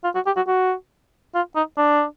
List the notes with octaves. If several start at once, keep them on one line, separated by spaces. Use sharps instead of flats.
F4
F#4
G4
F#4
F#4
F4
D#4
D4